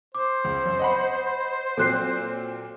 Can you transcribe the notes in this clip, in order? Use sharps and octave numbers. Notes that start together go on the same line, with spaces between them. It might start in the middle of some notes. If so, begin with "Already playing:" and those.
C5 D6
C#2
F#2
D#5 F#5 B5
A#2 F#3 C4 A4 F#6 C7